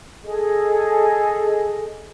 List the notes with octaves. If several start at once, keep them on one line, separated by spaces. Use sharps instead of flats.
G#4 A4 D#5